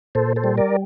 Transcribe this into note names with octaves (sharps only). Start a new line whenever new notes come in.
A#2 A4 C5
A4 C5
G3
A#4 D5